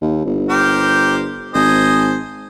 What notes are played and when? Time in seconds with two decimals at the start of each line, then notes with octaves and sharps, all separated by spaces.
0.02 D#2
0.25 G1
0.50 G4 A#4 C5
1.54 G#1 C5 D#5 G#5